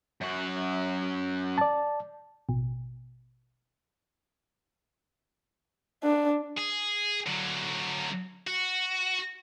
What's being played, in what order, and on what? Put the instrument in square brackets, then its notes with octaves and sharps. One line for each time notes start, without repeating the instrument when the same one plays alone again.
[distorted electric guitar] F#2 F#4
[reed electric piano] D5 A5
[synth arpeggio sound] A1 B2
[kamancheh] D4
[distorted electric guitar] G#4
D3 F#3
F#4